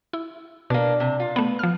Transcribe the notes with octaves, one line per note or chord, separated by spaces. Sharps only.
E4
B2 A#3 D4
C3
F4
A3 B3 B4
F3 F6